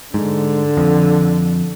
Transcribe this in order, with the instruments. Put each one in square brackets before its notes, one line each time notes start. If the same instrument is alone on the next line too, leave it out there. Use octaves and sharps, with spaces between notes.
[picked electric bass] G#2 [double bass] D3
[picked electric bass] F2